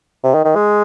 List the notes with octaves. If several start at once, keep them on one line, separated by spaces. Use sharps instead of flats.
C3
D#3
D#3
G#3